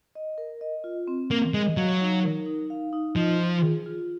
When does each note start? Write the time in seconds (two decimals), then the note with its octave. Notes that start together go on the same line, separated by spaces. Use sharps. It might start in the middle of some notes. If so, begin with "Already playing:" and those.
0.15 D#5
0.38 A#4
0.61 D#5
0.84 F4
1.08 C4
1.31 A#3 A#4
1.54 G#3 D#5
1.77 F#3 F5
2.01 D#4
2.23 A#4
2.46 D#4
2.70 F5
2.93 D#4
3.16 F3 D#5
3.39 F4
3.62 G#4
3.86 F4